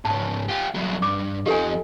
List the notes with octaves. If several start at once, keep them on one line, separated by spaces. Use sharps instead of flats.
G#2 C#3 A5
F4 G4
C2 F#3
G2 D6
F2 F3 D#4 G4 A4 G#5